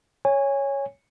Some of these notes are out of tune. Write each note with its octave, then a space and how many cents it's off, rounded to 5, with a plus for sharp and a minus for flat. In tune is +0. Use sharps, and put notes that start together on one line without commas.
C#5 +0 G#5 -20